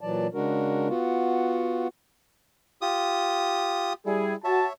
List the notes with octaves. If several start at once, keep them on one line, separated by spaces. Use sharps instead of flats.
A#2 E3 F#3 D5 A5
C#3 G#3 D4 F#4 A#4
B3 F4 F#4
F4 G4 D#6
G3 E4 G#4
F#4 C#5 E5 A5